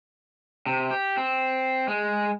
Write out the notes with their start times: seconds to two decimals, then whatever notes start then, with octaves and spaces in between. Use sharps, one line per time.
0.66 C3
0.91 G4
1.17 C4
1.88 G#3